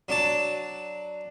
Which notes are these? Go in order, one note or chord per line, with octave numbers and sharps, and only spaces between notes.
F#3 D4 A5